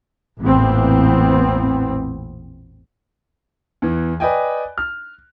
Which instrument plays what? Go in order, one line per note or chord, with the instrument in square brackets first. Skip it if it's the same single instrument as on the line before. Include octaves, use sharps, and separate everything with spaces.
[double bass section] A1 E2 A#2 E3 B3 C4
[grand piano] E2 E3
B4 D5 D#5 G5 G#5
F6